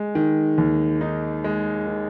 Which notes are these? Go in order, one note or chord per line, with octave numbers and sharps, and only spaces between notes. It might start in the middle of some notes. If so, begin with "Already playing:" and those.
Already playing: G#3
D#3
D#2
D#4
G#3
D#3